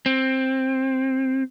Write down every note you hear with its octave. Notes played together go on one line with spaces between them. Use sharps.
C4